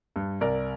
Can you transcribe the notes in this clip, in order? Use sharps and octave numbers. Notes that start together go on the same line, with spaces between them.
G2
C2 A#4 D5